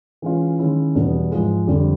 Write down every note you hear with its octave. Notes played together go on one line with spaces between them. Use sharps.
E3 G#3 C#4 F4
D#3 G#3 C#4 E4
E2 B2 G3 B3
G#2 F3 G#3
F2 D3 G3